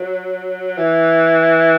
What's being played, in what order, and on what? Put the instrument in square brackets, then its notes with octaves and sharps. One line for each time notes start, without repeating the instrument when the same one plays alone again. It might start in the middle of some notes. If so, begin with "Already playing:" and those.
Already playing: [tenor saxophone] F#3
E3